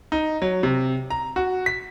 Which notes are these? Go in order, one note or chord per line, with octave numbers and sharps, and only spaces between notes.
D#4
F#3
C3
A#5
F#4
B6